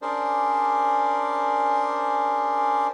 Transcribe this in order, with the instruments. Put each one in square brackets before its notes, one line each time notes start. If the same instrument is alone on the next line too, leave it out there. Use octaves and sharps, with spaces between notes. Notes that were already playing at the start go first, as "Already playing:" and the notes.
[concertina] C#4 D4 G#4 A#4 C5 D5